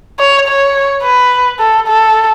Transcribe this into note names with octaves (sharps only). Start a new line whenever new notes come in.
C#5
C#5
B4
A4
A4